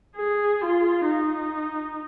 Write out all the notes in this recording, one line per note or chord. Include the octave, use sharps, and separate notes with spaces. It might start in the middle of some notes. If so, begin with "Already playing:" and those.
G#4
F4
D#4